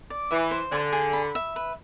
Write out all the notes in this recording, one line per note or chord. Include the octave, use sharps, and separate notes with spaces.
D5
E3 E5
C5
D3 G#5
G#4
B5
E5
B4